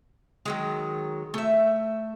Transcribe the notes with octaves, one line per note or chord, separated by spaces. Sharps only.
D#3 F#3 G#3
A3 E5